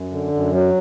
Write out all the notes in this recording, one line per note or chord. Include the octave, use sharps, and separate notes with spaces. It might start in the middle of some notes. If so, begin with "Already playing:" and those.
Already playing: F#2
D3
F#2
F#3